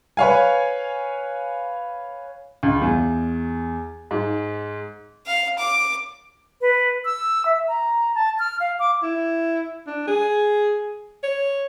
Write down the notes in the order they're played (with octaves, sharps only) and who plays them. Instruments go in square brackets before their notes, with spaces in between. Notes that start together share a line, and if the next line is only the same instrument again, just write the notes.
[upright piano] B4 C#5 F5 G#5
C#2
E2
G#2
[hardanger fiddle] F5
D6
[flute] B4
E6
E5
A#5
A5
F6
F5
D6
[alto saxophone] E4
D4
G#4
C#5